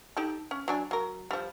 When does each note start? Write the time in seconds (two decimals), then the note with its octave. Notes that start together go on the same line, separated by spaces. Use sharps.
0.17 D#4 G4 A4
0.51 C#4
0.68 F#3 D4 G#5
0.91 F#3 A#4
1.31 F3 G3